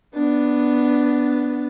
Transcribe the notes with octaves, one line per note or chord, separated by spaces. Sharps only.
B3 D4